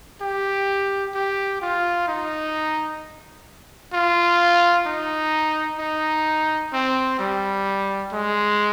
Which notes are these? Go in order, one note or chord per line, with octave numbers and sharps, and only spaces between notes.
G4
G4
F4
D#4
F4
D#4
D#4
C4
G3
G#3